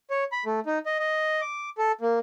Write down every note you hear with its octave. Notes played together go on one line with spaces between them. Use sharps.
C#5
B5
A3
D#4
D#5
D#5
D6
A4
A#3